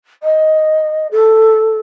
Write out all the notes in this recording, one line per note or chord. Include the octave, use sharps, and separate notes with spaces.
D#5
A4